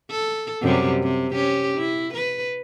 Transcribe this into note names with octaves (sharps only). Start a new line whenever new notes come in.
A4
F#2 C3 G3
C3
C#4 G4
E4
B4